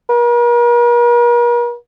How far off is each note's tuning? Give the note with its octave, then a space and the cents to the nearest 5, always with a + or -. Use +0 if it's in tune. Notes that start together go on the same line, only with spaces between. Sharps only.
A#4 +45